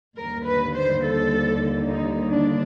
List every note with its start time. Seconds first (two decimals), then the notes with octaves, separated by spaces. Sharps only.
0.17 D#2 D3 G3 A#4
0.46 B4
0.75 C5
1.04 A4
1.89 D#4
2.32 D4